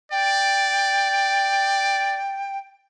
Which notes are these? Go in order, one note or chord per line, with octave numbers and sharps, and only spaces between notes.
D5 G5